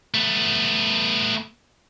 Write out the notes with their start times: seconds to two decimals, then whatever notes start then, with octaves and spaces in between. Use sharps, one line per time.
0.14 A3 B3